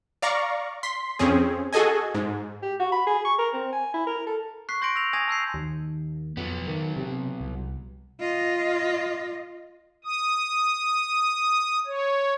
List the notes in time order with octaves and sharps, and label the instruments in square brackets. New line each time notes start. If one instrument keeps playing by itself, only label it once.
[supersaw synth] D5 F5 A#5 C#6
C6 B6
F2 C4 C#4 G#4
F#4 G#4 A4 D#5 G#5
G#2
[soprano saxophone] G4
F#4
B5
G#4
C#6
A#4
C4
G#5
E4
A#4
A4
[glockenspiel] C#6 F#6 B6 C7
C6 G6 A#6 C#7 D7 F#7
E6 A#6 F7
G#5 D#6 G#6 A#6 D#7 F7
A5 E6 G6 C7
[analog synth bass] D#2
[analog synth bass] F2 [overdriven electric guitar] F#3 B3
[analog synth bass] D#3
C3
C2
[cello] F4 D#5
[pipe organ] D#6
C#5